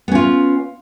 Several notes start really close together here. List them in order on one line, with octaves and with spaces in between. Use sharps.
B3 C#4 F4